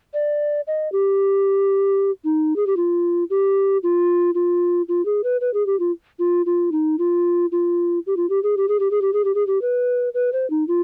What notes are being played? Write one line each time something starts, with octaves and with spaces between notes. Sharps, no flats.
D5
D#5
G4
D#4
G#4
G4
F4
G4
F4
F4
F4
G#4
B4
B4
G#4
G4
F4
F4
F4
D#4
F4
F4
G4
F4
G4
G#4
G4
G#4
G4
G#4
G4
G#4
G4
G#4
G4
B4
B4
C5
D#4
F4